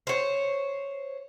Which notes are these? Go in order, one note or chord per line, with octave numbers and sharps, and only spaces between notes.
C5 C#5